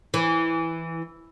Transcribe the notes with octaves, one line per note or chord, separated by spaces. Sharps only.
E3